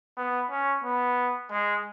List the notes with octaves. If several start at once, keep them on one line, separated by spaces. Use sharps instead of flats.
B3
C#4
B3
G#3